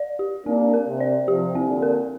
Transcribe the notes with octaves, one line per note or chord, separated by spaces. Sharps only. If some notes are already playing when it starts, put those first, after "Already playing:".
Already playing: D5
G4
A#3 C4 D4
A#4
C3
D5
C3 F3 G4
C4
A#2 D3
A#4